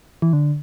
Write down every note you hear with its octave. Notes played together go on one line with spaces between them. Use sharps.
E3
D3